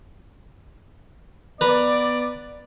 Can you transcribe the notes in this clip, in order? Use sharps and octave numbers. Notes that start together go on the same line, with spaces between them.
B3 B4 D5 A#5